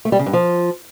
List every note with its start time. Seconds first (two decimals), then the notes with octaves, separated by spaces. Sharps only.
0.05 A3
0.12 G3
0.19 C#3
0.26 G2
0.33 F3